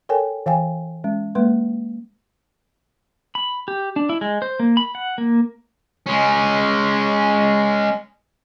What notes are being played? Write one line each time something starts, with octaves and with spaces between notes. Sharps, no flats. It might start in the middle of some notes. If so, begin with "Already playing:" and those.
A4 A#4 C#5 G5 G#5
E3 F5 G5 G#5
G#3 C#4
G#3 A#3 B4 C6
B5
G4
D4
E4
G#3
C5
A#3
B5
F#5
A#3
G#3 C#4